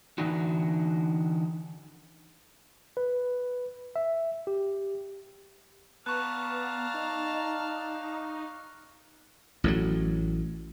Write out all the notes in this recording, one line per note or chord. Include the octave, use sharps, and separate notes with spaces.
D3 E3 D4 D#4 F#4
B4
E5
G4
B3 D5 F5 A5 A#5 C#6 F#6
D#4
A1 A2 C#3 F#3